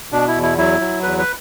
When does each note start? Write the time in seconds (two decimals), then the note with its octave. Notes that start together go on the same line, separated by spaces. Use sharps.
0.12 B2 D4
0.28 E4
0.35 E2
0.43 E4
0.58 F#3 E4
0.80 F#3
1.03 E2 B4
1.18 B4